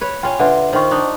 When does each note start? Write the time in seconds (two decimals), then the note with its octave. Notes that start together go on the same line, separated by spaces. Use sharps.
0.01 B4 C#5
0.23 C#4 F4 G5
0.39 D3 F4 B4 E5 F#5
0.73 D#3 F4 C5 G5 C#6
0.91 D4 D#4